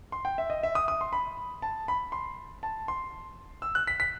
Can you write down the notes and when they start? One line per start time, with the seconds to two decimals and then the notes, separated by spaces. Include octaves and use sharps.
0.12 C6
0.25 G5
0.38 E5
0.50 D#5
0.63 E5
0.75 D#6
0.88 D#6
1.01 C6
1.13 B5
1.62 A5
1.88 B5
2.12 C6
2.63 A5
2.88 C6
3.62 E6
3.75 F#6
3.87 B6
4.00 B6